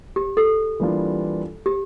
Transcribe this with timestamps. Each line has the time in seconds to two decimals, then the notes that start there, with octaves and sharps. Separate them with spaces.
0.16 G4
0.37 A4
0.80 E3 G3 A#3 D4 F4
1.66 G4